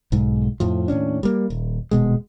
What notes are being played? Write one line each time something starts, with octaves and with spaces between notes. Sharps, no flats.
B1 G#2
F2 A2 F3
D#2 A2 C#4 D4
G3 A#3
D#1
D#1 B2 G#3